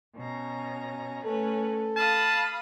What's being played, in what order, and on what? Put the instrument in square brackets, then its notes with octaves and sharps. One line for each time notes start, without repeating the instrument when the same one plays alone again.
[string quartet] B2 C#4 A#5
[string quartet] A3 C#4 B4 [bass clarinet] A4
[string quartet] F5 B5 D#6 [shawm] A5